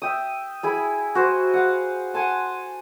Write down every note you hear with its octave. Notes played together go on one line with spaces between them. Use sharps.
E5 G5 D#6
E4 G#4 B5
F#4 C5
F5 F#5
F#5 G#5 A5 C6